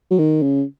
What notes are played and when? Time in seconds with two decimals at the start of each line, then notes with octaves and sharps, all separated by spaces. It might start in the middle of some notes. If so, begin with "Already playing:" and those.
0.11 F#3
0.19 D#3
0.42 C#3